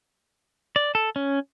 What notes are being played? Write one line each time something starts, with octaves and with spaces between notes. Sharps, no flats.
D5
A4
C#4